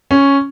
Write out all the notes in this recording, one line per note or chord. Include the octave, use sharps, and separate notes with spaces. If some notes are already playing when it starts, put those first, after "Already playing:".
C#4